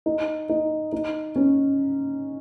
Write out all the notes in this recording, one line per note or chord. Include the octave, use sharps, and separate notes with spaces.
D#4
D#4
D#4
C#4